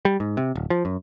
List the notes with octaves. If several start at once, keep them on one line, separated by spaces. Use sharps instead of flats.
G3
G#2
C3
D1
F3
F#2